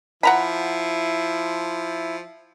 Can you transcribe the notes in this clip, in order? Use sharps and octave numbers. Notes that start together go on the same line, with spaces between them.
F3 E4 F#5 A#5 B5